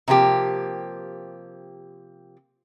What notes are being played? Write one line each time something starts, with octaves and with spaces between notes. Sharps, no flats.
C3 F3 A#3 G4